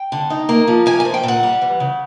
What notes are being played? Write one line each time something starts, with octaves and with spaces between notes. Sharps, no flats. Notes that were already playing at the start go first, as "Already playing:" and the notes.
Already playing: G5
D3
D#4
A#3
F3
A#3 G#5
G#5
F3
G5
A#2 F#5
G3
E3
C#3